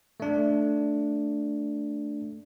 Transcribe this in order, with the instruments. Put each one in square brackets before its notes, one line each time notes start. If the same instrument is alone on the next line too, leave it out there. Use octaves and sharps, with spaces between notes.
[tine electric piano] A3 D4